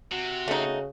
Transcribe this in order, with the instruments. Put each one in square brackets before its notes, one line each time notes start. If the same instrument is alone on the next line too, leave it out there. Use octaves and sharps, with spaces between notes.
[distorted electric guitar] C3 [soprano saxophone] F#4
[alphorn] C#3 [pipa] A3 D#4